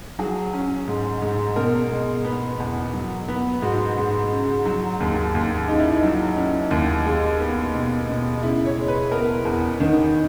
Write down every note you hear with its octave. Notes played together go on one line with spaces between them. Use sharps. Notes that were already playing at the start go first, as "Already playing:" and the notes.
F#3 G#4
C#4
G#2
G#2
B2 A#4
G#3
B3
E2
F#3
B3
G#2 F#4
G#2
C#3
F#3
D#2
D#2
C#3 D#4
E4
D#4
F#3
C#4
D#2
G#3
B3
B2
B2
C#3 E4
C#5
G#3
B4
B3 A#4
E2
D#3